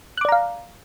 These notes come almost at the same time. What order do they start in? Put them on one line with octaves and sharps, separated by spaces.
F#6 D6 D5 A#5 F5